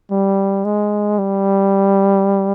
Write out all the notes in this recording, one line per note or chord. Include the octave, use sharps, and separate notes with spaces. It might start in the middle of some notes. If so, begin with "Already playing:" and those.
G3
G#3
G3